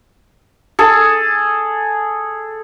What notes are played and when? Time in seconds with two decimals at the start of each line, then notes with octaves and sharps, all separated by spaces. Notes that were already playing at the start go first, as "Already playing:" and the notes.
0.79 G#4 A4